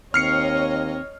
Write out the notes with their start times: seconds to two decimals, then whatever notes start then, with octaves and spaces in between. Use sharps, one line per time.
0.14 D#2 C4 C#5 D#5 F6 C7 C#7